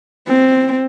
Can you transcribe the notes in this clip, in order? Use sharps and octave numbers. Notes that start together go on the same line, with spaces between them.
C4